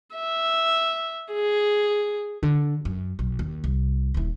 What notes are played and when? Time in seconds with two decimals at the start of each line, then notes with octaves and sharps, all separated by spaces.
0.15 E5
1.32 G#4
2.43 D3
2.85 F#2
3.19 B1
3.39 D#2
3.64 C2
4.14 D#1 E4